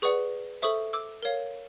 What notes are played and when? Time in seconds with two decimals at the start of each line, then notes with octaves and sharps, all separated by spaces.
0.02 G#4 B4 D5 F#5 C#6 D#6
0.62 A4 C5 E5 C#6 D#6
0.93 D6 E6
1.23 A#4 C#5 F5